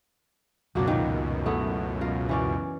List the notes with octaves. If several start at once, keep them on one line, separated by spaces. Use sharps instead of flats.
C#2 F#2 B2 F#3 A#3 D4
A#2 D#3
A3 B3 E4
F4 A#4
E3 C#4 D5